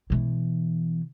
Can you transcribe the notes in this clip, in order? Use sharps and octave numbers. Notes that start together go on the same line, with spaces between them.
B2 E3